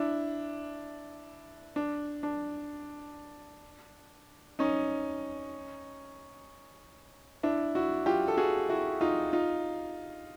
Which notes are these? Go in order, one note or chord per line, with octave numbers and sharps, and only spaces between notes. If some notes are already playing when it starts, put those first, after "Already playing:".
Already playing: D4 E4
D4
D4
C#4 D#4
D4 E4
E4 F#4
F4 G4
A4
F#4 G#4
E4 F#4
D#4 F4
D#4 F4